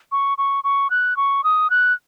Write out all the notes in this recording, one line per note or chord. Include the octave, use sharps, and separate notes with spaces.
C#6
C#6
C#6
F#6
C#6
D#6
F#6